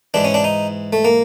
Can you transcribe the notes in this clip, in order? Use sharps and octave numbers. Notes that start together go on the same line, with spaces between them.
G#2 E3 D4
C#4
D4
D#4
A3
A#3